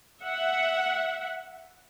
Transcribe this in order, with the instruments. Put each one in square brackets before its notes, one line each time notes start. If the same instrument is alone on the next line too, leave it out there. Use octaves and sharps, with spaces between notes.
[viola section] E5 F#5